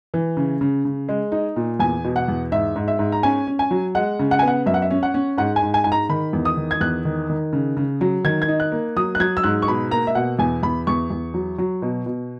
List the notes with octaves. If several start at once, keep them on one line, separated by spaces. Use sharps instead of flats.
E3
C#3
C#3
C#3
G#3
D#4
A#2
E2 G#5
B2
F#5
E2
G#2 E5
G#2
E5
G#2
A#5
C#4 G#5
C#4
G#5
F#3
G#3 F#5
C#3
F#5
B3 G#5
F#5
F#2 E5
F#5
E5
C#4
F#5
C#4
G#2 F#5
G#5
G#2
G#5
G#2 G#5
A#5
D#3 B5
E2
D#6
D#3
G#6
E2 F#6
D#3
D#3
C#3
C#3
F#3
D#3 G#6
G#6
D#4
F#6
A#3
F#3 D#6
F#6
F#3 G#6
E6
G#2 F#6
C#6
B2 B5
A#3 A#5
E5
B2 F#5
E2 G#5
E2 B5
E2 C#6
E2
F#3
F#3
B2
B2